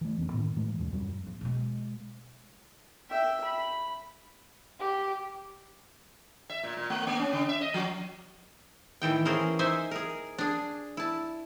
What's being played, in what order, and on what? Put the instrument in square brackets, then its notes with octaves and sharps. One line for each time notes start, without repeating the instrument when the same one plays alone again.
[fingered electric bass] E3 A3
F1 B3 C#4
A2 D#3 A#3
A2 E3 G#3 A3
D#2 B2 G#3 C#4
D#1 F#2 F#3 G3
[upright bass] G#2
B2 G#3
[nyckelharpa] E5 G5
B5
[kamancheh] G4
[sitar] E5
A#2
A#2
A3
A#3
C#4
C#3
E5
D#5
F3
[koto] A2 D#3 E3 G5
E3 A#3 C#4 G#4 A#4 C5
D#4 C5 E5 G#5
G#4 A#4
D4 G#4
E4 A5